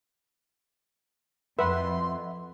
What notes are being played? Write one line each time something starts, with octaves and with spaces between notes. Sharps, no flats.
F2 B4 E5 F#5 B5 C6